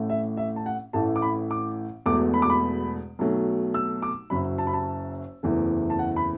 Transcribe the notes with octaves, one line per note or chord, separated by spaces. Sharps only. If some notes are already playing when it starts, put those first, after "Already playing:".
Already playing: A1 A2 A3
E5
E5
A5
F#5
A1 A2 E3 A3 A5
D6
B5
D6
E1 E2 B2 A3 D6
B5
D6
B5
B1 B2 F#3 A3
E6
D6
F#1 F#2 F#3 B5
A5
B5
A5
F#1 E2 E3 A3
A5
F#5
B5